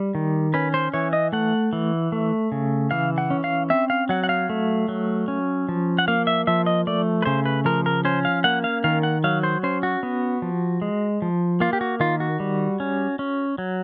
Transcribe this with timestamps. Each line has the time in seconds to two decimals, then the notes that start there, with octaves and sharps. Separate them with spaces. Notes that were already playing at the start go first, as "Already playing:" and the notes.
Already playing: G3
0.15 D#3
0.54 C#4 B4
0.74 C5
0.94 E3 C#5
1.13 D#5
1.33 A3 F#5
1.73 E3
2.12 A3
2.52 C#3
2.91 E3 F5
3.18 F#5
3.30 C#4
3.44 F5
3.70 C4 E5
3.90 F5
4.09 F#3 F#5
4.24 F#5
4.29 F5
4.49 A3
4.89 F#3
5.28 C#4
5.69 F3
5.99 F#5
6.08 A#3 F5
6.27 E5
6.47 F3 E5
6.66 D#5
6.87 A3 D5
7.22 B4
7.25 C#3 C5
7.46 B4
7.65 F3 A#4
7.86 A#4
8.05 C#4 C5
8.25 F5
8.44 A#3 F#5
8.64 F5
8.84 D#3 F5
9.03 F#5
9.24 F#3 F5
9.43 C5
9.63 C#4 C5
9.83 F#4
10.03 B3
10.42 F3
10.82 G#3
11.22 F3
11.60 A#3 F4
11.73 G4
11.81 F#4
12.00 D#3 F4
12.20 F#4
12.40 G3
12.80 C#4
13.19 C#4
13.58 F#3